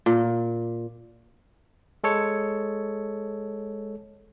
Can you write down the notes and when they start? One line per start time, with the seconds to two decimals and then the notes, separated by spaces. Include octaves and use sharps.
0.06 A#2
2.04 G#3 A4 C#5 C#7